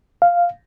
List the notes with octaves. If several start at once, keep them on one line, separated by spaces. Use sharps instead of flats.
F5